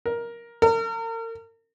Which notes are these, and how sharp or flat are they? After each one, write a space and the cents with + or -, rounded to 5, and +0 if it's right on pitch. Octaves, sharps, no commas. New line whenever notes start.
A#4 +10
A#4 -40